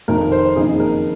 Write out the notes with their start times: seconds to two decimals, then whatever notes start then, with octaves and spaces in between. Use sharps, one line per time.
0.08 F1 F2 D#3 A#4
0.32 C5
0.56 F#1 F2 D#3 A#3 D#4 G#4
0.80 A#4